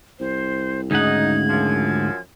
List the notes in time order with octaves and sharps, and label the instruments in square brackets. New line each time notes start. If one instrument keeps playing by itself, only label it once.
[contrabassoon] C2 [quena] C5
[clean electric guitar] D2 G#2 F#5 [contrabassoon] C#3 [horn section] D#4 [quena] G#6
[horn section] F#2 F3